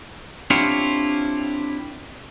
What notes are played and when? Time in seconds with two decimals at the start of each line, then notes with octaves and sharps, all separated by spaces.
0.50 C4 D4 E4 F4 G4 C#5